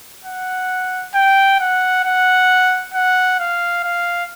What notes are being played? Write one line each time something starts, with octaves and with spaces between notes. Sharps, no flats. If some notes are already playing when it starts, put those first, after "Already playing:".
F#5
G5
F#5
F#5
F#5
F5
F5